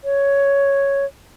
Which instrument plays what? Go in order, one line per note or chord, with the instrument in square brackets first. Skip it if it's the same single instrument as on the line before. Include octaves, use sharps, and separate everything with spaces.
[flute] C#5